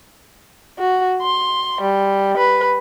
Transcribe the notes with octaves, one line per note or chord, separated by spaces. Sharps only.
F#4
C6
G3
B4